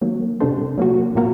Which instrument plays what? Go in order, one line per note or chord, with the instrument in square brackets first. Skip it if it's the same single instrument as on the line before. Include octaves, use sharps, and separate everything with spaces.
[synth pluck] D#3 F#3 A#3
C3 G3 D4 A4 C5
F#3 A#3 F#4
A#2 F#3 A#3 F#4 A#4